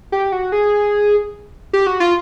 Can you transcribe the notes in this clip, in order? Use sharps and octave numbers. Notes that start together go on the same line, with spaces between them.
G4
F#4
G#4
G4
F#4
F4